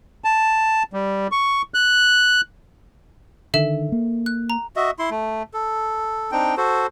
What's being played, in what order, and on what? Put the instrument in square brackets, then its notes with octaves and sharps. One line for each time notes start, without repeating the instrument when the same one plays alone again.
[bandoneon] A5
G3
C#6
F#6
[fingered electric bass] D3 D#3 [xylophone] A4 E5 E7
[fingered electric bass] A#3
[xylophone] F#6
A#5
[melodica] F#4 D#5 E5
E4 C6
A3
A4
C4 D4 D#4 G5
F#4 A4 C5